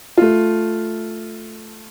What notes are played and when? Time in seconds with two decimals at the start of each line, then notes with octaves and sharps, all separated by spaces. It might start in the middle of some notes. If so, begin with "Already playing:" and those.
0.17 A3 F4